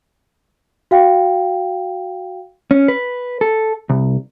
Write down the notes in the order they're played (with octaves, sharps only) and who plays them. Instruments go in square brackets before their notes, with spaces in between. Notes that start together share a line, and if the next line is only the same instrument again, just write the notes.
[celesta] F#4 F5 G5
[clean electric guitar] C#4
B4
A4
C2